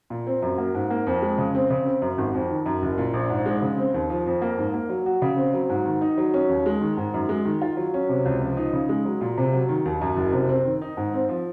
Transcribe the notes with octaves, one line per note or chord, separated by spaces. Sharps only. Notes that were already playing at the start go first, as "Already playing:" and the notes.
A#2
C4
F#2
A#3
G#2
A#3
F2
G#3
C#3
C4
C#3
C4
F#2
G#1
F2
D#3
F#2
F#1
A#2
A#1
G#2
G#3
C#3
C4
D#2
F3
F2
A#3
G#2
A#3
F#3
F#4
C#3
C4
F#3
G#2
D#3
D#4
F#3
C#4
D#2
G#3
D#3
G#2
F#2
G#3
D#3
F4
F#3
C#4
C3
C#2
F3
D#4
C#3
G#3
F#3
A#2
C3
F#3
D#3
D#2
F#2
F#1
C3
C4
D#3
D#4
G#2
C4
F3